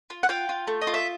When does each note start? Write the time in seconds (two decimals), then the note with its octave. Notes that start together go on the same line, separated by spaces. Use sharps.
0.10 F4
0.23 F#5
0.29 F4 F5 G5
0.49 F4
0.67 A3
0.81 D#5
0.87 F4
0.94 E5